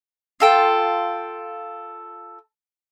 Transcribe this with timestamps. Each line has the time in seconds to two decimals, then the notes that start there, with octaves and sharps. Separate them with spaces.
0.40 F4 A4 G5